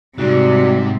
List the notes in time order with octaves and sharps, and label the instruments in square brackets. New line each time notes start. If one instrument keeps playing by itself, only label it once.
[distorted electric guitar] G#2 [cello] C3 G3 [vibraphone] F#4 D5